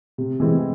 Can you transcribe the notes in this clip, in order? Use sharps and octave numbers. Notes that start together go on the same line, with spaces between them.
C3
E3 G#3 C4